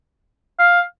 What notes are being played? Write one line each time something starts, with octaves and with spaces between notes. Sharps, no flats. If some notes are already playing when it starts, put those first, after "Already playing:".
F5